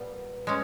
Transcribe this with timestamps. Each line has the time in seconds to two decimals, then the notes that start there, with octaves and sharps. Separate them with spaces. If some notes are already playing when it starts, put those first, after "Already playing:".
Already playing: A#2 G3 B3
0.47 G#3 C#4